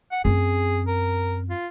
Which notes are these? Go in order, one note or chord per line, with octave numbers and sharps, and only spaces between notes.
F#5
F#2 C4 G#4
A#4
F4